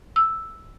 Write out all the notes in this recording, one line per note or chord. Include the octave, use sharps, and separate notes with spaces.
E6